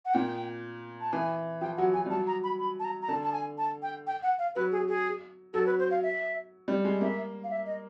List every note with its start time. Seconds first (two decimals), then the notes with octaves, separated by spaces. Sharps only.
0.05 F#5
0.14 A#2 G5
1.01 A5
1.12 E3 G#5
1.61 F3 G5
1.77 F#3 F#5
1.94 F#3 G#5
2.06 G3
2.10 F#3 A5
2.27 A#5
2.43 B5
2.59 B5
2.79 A5
2.85 A#5
3.02 A#5
3.08 D3 A5
3.23 A5
3.33 G#5
3.58 A5
3.82 G5
4.07 G5
4.23 F#5
4.39 F5
4.55 F#3 B4
4.72 G#4
4.88 G#4
5.54 F#3 A4
5.66 B4
5.79 C5
5.91 F5
6.03 E5
6.68 G3
6.84 G#3
7.01 A#3 E5
7.44 F5
7.51 E5
7.66 D#5